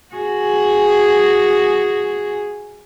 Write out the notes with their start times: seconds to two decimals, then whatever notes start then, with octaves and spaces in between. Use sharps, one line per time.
0.14 F#4 G#4